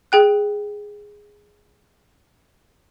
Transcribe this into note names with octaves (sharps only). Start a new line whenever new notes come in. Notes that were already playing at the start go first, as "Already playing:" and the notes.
G#4 G5 F#6